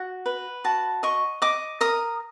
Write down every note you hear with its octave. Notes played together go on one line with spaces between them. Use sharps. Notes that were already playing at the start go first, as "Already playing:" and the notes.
Already playing: F#4
B4
F#4 A5
D#5 C#6
D#5 D6
A#4 D#6